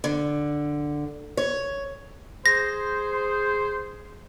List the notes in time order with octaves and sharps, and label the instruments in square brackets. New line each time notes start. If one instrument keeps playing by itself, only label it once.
[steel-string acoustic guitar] D3
C#5
[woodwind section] G#4 C5 [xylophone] A#6